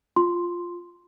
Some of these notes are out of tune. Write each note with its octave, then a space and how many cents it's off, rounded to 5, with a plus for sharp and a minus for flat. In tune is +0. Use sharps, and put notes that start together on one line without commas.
F4 +0 C6 +0